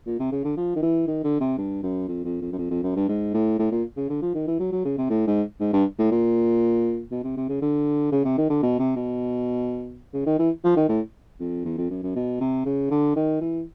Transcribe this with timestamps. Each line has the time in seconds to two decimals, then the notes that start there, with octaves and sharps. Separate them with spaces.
0.06 A#2
0.19 C3
0.32 C#3
0.44 D3
0.57 F3
0.76 D#3
0.82 E3
1.07 D#3
1.24 D3
1.40 C3
1.58 G2
1.83 F#2
2.08 F2
2.25 F2
2.42 F2
2.52 F#2
2.59 F2
2.70 F2
2.83 F#2
2.96 G2
3.09 G#2
3.34 A2
3.59 A2
3.72 A#2
3.97 C#3
4.09 D3
4.22 F3
4.34 D#3
4.47 E3
4.60 F#3
4.72 F#3
4.85 C#3
4.98 C3
5.10 A2
5.27 G#2
5.60 G#2
5.73 G2
5.98 A2
6.11 A#2
7.11 B2
7.24 C3
7.37 C3
7.49 C#3
7.62 D3
8.12 C#3
8.25 C3
8.38 D#3
8.50 D3
8.63 B2
8.79 C3
8.96 B2
10.13 C#3
10.26 D#3
10.39 E3
10.64 F3
10.77 D#3
10.89 A2
11.40 F2
11.65 E2
11.78 F2
11.90 F#2
12.03 F#2
12.15 B2
12.41 C3
12.65 C#3
12.91 D3
13.16 D#3
13.41 E3